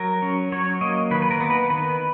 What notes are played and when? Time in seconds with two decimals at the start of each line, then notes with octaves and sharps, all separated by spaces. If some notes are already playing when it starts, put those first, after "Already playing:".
Already playing: F#3 A#4
0.22 C#4
0.52 F#3 C#5
0.81 A#3 D#5
1.11 D#3 B4
1.22 B4
1.31 A#4
1.40 B3
1.50 B4
1.70 D#3 B4